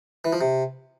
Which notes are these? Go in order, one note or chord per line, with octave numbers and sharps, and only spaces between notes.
E3
F3
C3